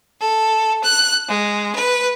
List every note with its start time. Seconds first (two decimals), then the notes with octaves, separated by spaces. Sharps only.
0.20 A4
0.83 F#6
1.29 G#3
1.74 B4